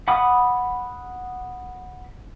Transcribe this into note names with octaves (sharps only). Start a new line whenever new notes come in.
F#5 B5 D6 D#6